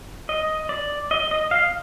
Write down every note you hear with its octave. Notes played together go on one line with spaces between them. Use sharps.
D#5
D5
D#5
D#5
F5